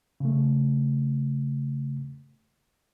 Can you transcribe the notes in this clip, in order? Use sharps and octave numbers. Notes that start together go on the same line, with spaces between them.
C#3 A3